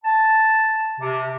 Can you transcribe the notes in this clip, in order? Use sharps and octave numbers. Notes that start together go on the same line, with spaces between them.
A5
C3